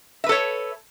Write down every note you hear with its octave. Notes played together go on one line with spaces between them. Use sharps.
A4 B4 C#5 E5